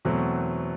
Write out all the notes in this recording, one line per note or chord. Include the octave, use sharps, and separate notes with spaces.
E2 B2 F#3 A3 C4